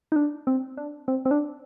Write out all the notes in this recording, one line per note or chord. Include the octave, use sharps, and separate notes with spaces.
D#4
D4
C4
D4
C4
C4
D4